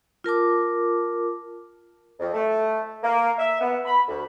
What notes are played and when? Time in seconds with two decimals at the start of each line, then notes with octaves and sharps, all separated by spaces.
0.24 F4 A#4 A5 D6
2.20 F2
2.34 A3
3.04 A#3
3.39 E5
3.61 B3
3.85 B5
4.09 D2